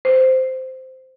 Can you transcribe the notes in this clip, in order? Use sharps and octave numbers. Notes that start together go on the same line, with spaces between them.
C5